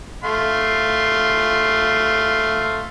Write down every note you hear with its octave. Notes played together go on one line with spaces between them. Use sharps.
A3 F5 C6